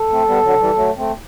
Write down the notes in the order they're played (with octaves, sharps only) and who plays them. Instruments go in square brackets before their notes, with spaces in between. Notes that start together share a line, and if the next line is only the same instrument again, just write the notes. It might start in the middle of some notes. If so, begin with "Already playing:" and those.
Already playing: [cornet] A4
[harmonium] A3 C4
G3 B3
D3 F#3
E3 G3
F#3 A3
A3 C4